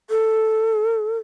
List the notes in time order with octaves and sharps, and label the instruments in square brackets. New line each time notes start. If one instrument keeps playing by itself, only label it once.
[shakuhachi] A4